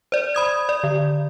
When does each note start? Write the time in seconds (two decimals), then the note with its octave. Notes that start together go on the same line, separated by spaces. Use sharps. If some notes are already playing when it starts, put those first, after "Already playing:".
0.12 C5 D5
0.35 B5 D#6 G#6
0.69 D5
0.84 D3